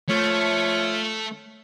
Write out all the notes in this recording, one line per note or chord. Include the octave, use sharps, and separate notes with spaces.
F3 A3 F4 C#5